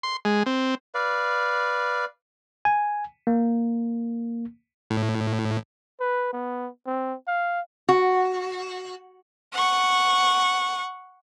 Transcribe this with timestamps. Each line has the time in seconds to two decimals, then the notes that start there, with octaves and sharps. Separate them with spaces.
0.03 C6
0.25 G#3
0.46 C4
0.94 B4 D5 F5
2.65 G#5
3.27 A#3
4.90 A2
6.00 B4
6.33 B3
6.86 C4
7.27 F5
7.89 F#4
9.53 F#5 C#6